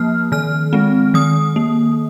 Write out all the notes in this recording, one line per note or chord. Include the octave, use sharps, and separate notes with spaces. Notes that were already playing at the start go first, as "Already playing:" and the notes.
Already playing: F3 A#3 F6
D#3 F6
G#3 C4
D#3 D#6
A#3